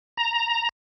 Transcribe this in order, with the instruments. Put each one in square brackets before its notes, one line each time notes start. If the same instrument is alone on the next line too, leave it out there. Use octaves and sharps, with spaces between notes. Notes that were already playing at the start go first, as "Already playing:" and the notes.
[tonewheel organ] A#5